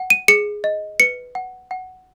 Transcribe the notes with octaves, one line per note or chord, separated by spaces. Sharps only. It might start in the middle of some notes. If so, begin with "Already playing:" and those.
Already playing: F#5
D#7
G#4 C#7
D#5
B4 C#7
F#5
F#5